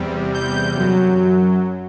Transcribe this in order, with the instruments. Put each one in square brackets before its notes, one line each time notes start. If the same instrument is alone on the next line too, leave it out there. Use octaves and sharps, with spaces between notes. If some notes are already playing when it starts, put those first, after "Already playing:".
Already playing: [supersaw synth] E2 C3 G3
G6
F#2 F#3